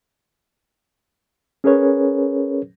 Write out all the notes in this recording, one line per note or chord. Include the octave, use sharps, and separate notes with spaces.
C#4 G#4 A#4 B4 C#5